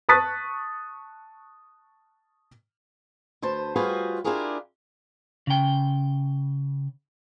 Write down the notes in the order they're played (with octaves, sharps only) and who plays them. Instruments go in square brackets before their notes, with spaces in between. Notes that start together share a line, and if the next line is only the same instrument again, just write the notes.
[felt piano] A5 C#6 D#6 F#6 A6 B6
[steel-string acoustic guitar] D2 B4 C5 A5
G3 F4 F#4 G#4 B4 C5
D4 E4 F4 G4 G#4 A#4
[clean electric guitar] C#3 G5